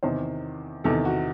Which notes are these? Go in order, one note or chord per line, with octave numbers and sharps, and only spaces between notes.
E2 C3 D#3 C5
E2 C3 D#3 A4
F#4